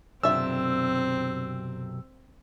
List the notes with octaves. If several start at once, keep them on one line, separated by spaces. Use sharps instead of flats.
B1 F#2 C3 C4 D4 F4 E5 E6